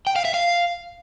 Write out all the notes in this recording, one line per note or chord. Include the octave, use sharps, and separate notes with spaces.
G5
F5
E5
F5